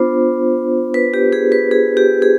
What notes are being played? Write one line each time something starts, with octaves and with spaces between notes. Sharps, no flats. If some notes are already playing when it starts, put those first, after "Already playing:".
Already playing: B3 D4 F4 C5
B4
G4
G#4
B4
G#4
G4
G#4